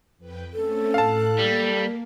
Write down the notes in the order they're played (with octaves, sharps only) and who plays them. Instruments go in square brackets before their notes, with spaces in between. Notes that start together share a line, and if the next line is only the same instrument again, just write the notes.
[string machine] F2 B4 G5
[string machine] A3 C4 C#4 [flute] A4
[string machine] A2 F#6 [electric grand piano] F5 A5
[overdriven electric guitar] G3 [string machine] A#3